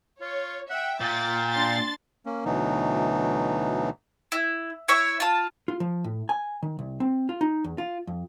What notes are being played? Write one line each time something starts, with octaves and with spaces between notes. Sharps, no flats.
F4 C#5
E5 F#5 G5
A#2 G5 A6
D4 C6 A6
A#3 C#4
D2 B2 E3 F#3 D#4
E4
E4 C#5 E5
F4 A5
F4
F3
A2
G#5
D#3
C2
C4
F4
D#4
E2
F4
F2